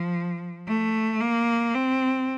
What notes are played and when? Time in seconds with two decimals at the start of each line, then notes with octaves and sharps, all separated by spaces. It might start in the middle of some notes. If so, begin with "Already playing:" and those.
Already playing: F3
0.68 A3
1.21 A#3
1.74 C4